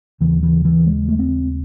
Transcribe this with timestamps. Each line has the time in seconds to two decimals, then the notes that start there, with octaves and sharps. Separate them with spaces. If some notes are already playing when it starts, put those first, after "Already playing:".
0.21 D#2 C#3 E3
0.43 E3
0.65 E3
0.86 G#3
1.08 A3
1.19 C4